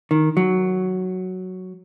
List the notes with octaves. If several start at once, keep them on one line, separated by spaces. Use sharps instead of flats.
D#3
F#3